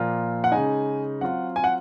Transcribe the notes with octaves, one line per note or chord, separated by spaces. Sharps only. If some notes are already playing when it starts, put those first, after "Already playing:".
Already playing: A#2 F3 A#3 F4
F#5
C#3 G#3 D#4 G#5
F#3 C4 F4 F#5
G#5
F#5